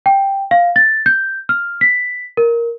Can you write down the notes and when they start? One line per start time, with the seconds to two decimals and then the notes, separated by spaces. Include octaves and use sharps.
0.06 G5
0.51 F5
0.76 A6
1.06 G6
1.49 F6
1.81 B6
2.37 A#4